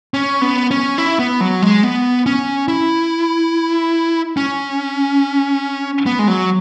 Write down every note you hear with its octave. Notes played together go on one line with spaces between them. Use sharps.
C#4
B3
C#4
E4
B3
F#3
G#3
B3
C#4
E4
C#4
B3
G#3
F#3